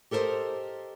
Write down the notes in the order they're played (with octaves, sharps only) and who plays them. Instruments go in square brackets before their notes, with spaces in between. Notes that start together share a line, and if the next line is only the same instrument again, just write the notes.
[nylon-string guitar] G4 A4 A#4 C5 D#5